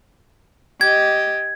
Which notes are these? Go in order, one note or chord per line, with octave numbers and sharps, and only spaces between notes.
G4 D#5 G#6